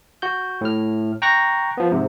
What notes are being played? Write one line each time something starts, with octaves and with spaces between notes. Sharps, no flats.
F#4 G6
A2 F6
G5 A#5 C#6 F#6 A#6
F3 B3
G#2 C3